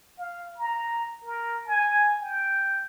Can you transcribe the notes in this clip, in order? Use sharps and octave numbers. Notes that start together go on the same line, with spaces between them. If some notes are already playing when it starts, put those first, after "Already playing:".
F5
A#5
A#4
G#5
G5